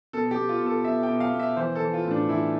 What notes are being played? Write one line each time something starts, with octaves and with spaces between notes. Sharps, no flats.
B2 A4
G4
B2
F4
B2
A4
B2 E5
G5
B2
F5
B2
E5
E3 C5
A4
E3
F4
A2
D4
E3 E4